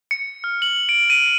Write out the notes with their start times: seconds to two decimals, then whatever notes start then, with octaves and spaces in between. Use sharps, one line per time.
0.11 C#7
0.44 F6
0.62 F#7
0.89 D7
1.10 D#7